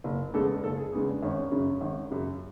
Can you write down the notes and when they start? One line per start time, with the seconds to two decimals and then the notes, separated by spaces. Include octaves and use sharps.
0.04 F#1
0.34 E2 C#3 G#3 A4
0.63 F#1 A4
0.77 G#4
0.93 E2 C#3 G#3 G#4
1.08 D4
1.22 G#1 C#4
1.51 F#2 C#3
1.81 G#1
2.10 F#2 C#3